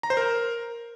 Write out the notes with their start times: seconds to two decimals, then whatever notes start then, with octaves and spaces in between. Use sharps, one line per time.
0.03 A#5
0.10 C5
0.17 A#4